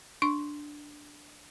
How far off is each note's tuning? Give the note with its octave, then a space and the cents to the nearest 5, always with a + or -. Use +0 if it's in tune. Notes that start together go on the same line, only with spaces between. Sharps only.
D4 +0 C#6 -5